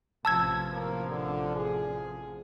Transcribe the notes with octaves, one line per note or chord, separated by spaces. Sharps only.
A1 C3 F3 A5 E6 G#6
A#3
D3
G#4